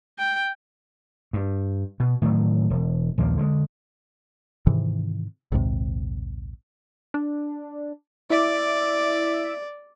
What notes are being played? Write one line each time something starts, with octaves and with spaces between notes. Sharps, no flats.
G5
G2
B2
A2 D#3 F3 F#3
E1
A#1 D#2 F3 A#3
D3 F3 G#3
G#2 C3 D#3 E3
A#1 D#2 G#2 C3
D4
E4 D5 E5 D6